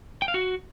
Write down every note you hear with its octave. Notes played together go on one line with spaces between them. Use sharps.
G5
F5
F#4